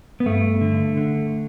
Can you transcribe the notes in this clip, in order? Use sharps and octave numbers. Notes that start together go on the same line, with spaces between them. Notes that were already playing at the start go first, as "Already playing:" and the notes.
B3
G2 A3
D3
D3